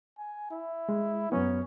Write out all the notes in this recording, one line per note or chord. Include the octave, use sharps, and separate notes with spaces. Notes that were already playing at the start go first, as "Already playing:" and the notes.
G#5
E4
G#3
F#2 F#3 B3 C#4